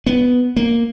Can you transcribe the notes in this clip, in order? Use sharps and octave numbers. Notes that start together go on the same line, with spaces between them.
B3
A#3